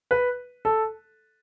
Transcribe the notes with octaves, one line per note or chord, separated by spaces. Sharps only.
B4
A4